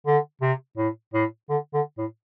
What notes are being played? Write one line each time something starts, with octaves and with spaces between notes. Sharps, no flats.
D3
C3
A2
A2
D3
D3
A2